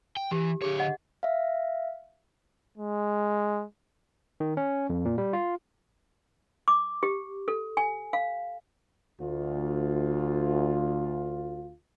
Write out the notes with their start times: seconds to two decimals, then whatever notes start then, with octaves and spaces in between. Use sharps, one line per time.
0.17 G5
0.32 E3 G4
0.62 D3 G4 G#4 C#5
0.79 D#5 F#5
1.23 E5 F5
2.78 G#3
4.40 D#3
4.57 C#4
4.90 F2
5.05 A#2
5.18 G3
5.33 F4
6.68 D6
7.03 G4
7.48 A4
7.77 G#5
8.13 F5
9.21 D2 F4